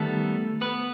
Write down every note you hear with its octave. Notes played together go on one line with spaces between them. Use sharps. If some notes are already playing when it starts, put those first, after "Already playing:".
Already playing: D#3 G3 A3 B3 A4
B3 B4